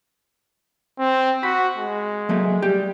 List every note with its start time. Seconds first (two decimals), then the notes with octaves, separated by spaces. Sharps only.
0.99 C4
1.43 F#4 B5
1.77 G#3
2.29 F#3 A3 A#3
2.62 G3 G4